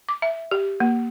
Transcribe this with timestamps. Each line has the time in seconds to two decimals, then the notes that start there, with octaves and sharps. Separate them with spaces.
0.09 D6
0.22 E5
0.51 G4
0.80 A#3